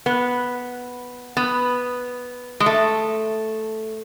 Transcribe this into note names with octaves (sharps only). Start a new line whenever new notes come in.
B3
B3
G#3
A3